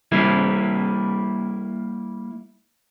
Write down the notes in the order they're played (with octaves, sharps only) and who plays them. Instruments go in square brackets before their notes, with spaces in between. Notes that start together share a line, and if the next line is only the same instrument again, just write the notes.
[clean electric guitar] G3 A#3 E4